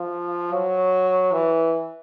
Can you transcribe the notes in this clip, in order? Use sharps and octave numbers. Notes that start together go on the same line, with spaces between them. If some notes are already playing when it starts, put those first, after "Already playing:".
Already playing: F3
F#3
E3